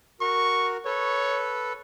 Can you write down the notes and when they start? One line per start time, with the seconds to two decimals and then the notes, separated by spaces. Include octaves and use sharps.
0.21 F#4 A#4 C#6
0.85 A4 B4 C#5